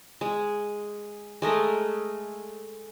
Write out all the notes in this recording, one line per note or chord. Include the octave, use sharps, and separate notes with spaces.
G#3
G#3 A3 A#4 D#5